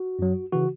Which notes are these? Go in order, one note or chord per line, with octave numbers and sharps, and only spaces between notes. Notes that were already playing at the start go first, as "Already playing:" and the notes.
Already playing: F#4
F#2 F#3
C#3 E3 F#4